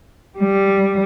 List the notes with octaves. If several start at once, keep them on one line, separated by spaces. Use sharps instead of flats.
G3